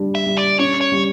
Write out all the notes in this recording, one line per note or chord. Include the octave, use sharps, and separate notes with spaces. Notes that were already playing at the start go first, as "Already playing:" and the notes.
Already playing: G3 D4
E5
G3
D5
C#4 C#5
C#5
G3